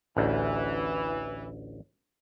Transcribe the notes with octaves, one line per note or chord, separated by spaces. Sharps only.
A1 D2 E3